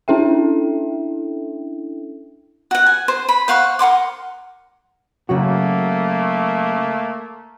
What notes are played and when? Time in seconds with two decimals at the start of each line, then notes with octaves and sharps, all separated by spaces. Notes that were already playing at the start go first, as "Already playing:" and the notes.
0.08 C#4 D4 E4 A4 E5 G5
2.71 F#4 F#5
2.86 G#5
3.08 C5
3.29 B5
3.48 C5 F5 F#5 C#6
3.79 A#4 F#5 C6 D6
5.29 C#3 F#3 A3 A#3 F#4